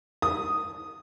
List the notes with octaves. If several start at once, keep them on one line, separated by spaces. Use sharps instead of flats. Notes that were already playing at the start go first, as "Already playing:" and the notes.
D#6